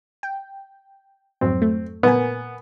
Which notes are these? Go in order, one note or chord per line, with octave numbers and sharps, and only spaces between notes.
G5
F2 G#2 F#3 C4
A3
A#2 B3 A#4 G#5